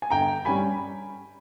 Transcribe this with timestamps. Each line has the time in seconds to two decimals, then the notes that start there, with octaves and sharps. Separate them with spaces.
0.02 G#5
0.10 G1 G5 A#5
0.45 G2 G3 C#4 G#5 B5